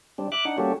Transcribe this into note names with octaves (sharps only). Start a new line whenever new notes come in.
G3 C4 D4
E5 D6 F#6
D4 D#4 F#5
G3 A#3 C#4 F#4 G4 A4